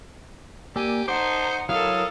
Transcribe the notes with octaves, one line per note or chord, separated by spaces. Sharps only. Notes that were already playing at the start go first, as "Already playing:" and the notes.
A#3 G4 D5 G#5 E6
D#4 C5 F#5 A5 D6
F#3 E4 A4 A#4 C#5 F5 D#6